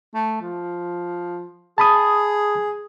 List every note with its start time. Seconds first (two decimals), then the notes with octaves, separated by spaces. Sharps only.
0.15 A3
0.42 F3
1.78 G#4 A5 B5 D#6